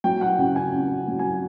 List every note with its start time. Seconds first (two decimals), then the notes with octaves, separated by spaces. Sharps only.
0.04 F#3 G5
0.21 F#5
0.39 C#3 G5
0.56 G#5
0.74 C#3
1.08 F#3
1.19 G#5